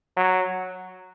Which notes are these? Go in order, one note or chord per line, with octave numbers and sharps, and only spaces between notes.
F#3